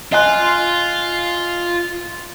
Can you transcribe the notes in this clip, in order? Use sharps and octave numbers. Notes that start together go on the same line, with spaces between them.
F4 D#5 G#5 F#6